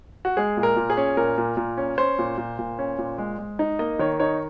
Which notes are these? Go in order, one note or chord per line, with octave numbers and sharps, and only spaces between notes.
F#4
G#3 G#4
A#2
A#4
A#2
G#4
C#4
A#2 A#4
A#2
A#2
C#4
C#4 C5
A#2
A#2
A#2
C#4
A#2
G#3
G#3
D#4
A#3 D#5
D#3 C#5
D#4 C#5